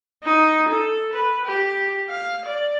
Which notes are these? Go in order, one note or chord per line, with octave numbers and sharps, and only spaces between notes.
D#4
A4
B4
G4
F5
D5